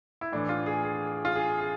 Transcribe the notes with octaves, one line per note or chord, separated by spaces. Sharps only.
E4
A2 E3 D4
F4
G#4
G#4
F4
G#4
G#4